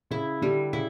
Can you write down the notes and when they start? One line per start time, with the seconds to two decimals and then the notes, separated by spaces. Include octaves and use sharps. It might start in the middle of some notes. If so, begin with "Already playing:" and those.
0.11 C#3 E4
0.42 D3 G3
0.73 C#3 E4